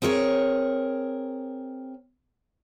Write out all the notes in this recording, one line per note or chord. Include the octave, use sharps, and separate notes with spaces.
C4 G#4 A#4 C#5